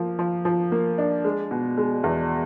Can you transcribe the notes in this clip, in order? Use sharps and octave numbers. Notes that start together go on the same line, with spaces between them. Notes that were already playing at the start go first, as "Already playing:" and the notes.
Already playing: F3 A#3
F3
F3
A#3
D4
G#3
B2
G#3
E2